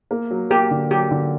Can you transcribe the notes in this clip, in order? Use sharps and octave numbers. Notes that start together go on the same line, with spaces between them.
A#3
F#3
A#3 G4
D3
F#3 G4
D3